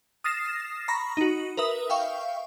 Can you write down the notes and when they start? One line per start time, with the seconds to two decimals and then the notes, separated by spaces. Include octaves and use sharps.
0.24 D#6 F6 A6 A#6 C7 E7
0.88 A#5 B5 C#6 A#6
1.17 D#4 F#4
1.57 A#4 B4 E5 D#6
1.90 E5 F5 G5 C#6